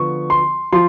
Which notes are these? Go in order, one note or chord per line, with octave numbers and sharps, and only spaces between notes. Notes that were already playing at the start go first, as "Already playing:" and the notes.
Already playing: D3 F3 B3 C#6
C6
F3 C6